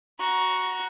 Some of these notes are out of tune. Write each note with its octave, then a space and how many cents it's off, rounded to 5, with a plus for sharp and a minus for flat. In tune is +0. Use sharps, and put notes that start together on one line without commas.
F#4 +0 A#5 +20